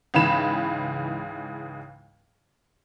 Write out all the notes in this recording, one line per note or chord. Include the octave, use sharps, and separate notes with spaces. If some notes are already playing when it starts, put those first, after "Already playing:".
C#2 G#2 C#3 E3 B5 E7